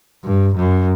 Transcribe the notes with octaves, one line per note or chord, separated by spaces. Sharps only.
G2
F#2